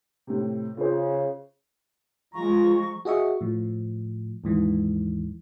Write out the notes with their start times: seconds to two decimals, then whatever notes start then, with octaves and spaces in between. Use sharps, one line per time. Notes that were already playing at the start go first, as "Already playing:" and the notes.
0.27 A2 C3
0.77 C#3 F4 C5
2.35 F3 G#3 F4 A#5 C#6
3.05 F#4 G#4 D#5 E5 C#6
3.41 A2 F3
4.44 D#2 G#2 E3